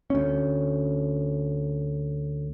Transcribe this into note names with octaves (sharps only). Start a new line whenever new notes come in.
D2 C#4